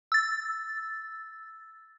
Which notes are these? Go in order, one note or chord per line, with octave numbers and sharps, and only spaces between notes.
E6 A6